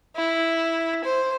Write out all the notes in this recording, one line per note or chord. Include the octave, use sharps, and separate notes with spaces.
E4
C5